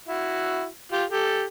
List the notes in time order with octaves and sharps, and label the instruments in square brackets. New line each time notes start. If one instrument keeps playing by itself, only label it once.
[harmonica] E4 F#4
F4 G4
G4 A4